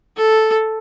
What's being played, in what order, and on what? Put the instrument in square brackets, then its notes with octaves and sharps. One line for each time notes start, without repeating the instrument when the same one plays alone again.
[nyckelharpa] A4